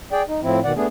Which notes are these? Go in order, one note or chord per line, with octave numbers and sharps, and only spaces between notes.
G#4 D5 G5
D#4
A2 F3 C4 E4
B2 D#3 D5 F#5
A3 B3 D4 G#4